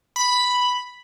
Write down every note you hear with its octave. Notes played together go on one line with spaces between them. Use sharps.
B5